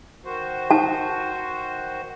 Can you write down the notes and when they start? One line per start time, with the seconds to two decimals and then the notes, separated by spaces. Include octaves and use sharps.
0.25 D#3 F#4 C5
0.71 A5